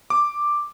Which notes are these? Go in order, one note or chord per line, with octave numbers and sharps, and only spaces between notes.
D6